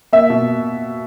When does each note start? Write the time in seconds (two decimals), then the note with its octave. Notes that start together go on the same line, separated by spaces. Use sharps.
0.13 A#3 E5
0.30 B2